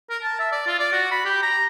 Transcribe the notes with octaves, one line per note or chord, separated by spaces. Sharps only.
A#4
A5
E5
D5
F4
D5
F#4
B5
G4
A#5